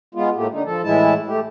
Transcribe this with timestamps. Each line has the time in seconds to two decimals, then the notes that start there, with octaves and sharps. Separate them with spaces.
0.15 G#3 B3 F4
0.36 A2 A3 A#3 G4
0.51 D3 D#4
0.64 F3 A4
0.83 A2 E3 G#3 E4 A5
1.27 A3 G4